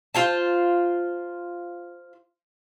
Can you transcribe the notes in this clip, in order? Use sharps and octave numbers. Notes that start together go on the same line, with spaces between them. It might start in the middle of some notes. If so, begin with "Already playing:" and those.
F4 C5 A5